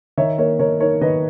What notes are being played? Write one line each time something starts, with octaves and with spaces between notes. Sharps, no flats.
D#3 C#5 E5
A#3 A#4 C#5
D#3 A#4 C#5
D#4 A#4 C#5
D#3 B4 D#5